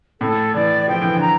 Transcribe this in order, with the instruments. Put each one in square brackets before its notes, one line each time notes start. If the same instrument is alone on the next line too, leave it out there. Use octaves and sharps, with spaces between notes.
[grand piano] A2 [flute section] A4
[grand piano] E3 [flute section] D5
[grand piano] F3 [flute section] G5
[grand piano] E3
D3
[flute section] A#5